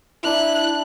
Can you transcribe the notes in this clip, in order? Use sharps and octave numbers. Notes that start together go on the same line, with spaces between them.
D4 E4 A#5 F#6